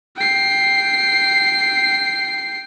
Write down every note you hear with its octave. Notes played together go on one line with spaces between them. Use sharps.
G5 C7